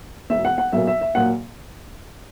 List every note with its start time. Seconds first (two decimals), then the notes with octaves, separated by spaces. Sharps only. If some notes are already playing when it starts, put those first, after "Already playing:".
0.30 E1 E2 B2 E5
0.45 F#5
0.58 F#5
0.72 B1 A#2 F#3 A#3 E5
0.87 E5
1.01 E5
1.15 A#2 F#3 A#3 F#5